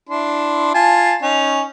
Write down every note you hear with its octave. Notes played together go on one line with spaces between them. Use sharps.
D4 E4 C6
F4 G#5 A5
C#4 D#4